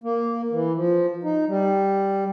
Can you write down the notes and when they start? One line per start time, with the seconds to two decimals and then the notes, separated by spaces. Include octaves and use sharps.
0.04 A#3
0.52 E3
0.76 F3
1.23 D#4
1.48 G3